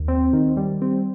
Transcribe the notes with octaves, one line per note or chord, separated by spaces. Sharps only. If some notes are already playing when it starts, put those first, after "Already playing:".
Already playing: D#2
C4
D#3
G3
C4